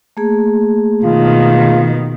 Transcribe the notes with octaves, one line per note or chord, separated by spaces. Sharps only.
A3 A#3 G#4
B2 D#3 F4